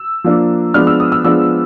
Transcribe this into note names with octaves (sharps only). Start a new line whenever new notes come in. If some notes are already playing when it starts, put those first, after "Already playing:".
Already playing: E6
F3 A#3 D4
F3 G#3 B3 D4 F6
E6
D#6
E6
F3 G#3 B3 D4 E6